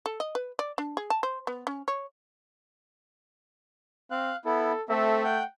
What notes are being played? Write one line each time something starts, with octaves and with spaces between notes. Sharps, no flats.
A4
D#5
B4
D5
D4
G#4
A5
C5
B3
C#4
C#5
C4 F5 F#6
B3 E4 A4
A3 C4 A4 E5
F#5 G5 G6